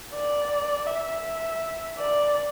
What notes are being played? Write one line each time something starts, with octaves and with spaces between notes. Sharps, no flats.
D5
E5
D5